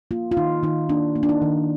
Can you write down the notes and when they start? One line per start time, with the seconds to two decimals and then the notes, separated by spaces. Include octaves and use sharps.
0.11 A#3 F4
0.31 F4
0.37 D#3 D#4
0.63 D#3 D#4
0.89 A#3 D4
1.16 A#3
1.23 D4
1.29 D#4
1.42 D#3